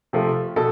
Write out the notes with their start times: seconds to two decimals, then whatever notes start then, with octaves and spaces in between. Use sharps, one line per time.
0.13 C3 F3 A3
0.56 B2 A4